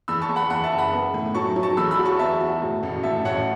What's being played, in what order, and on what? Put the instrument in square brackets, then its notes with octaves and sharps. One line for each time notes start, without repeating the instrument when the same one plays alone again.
[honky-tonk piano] E2 [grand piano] B5 E6
[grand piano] A5 C#6
[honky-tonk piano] E2
[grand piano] F#5 B5
[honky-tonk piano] E2 [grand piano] F#5 B5
[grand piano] E5 A5
[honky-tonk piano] F#1
[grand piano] F#5 B5
[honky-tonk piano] B3
A2
[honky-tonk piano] F#3 [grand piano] A5 C#6
[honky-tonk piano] F#3
[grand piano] A5 C#6
[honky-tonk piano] E2 [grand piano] B5 E6
[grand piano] B5 E6
[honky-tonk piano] F#4
[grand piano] A5 C#6
[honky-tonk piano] B3 [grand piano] E5 A5
[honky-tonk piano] F#4
A2
A1
[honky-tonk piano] A2 [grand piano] E5 A5
[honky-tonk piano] A1 [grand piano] C#5 F#5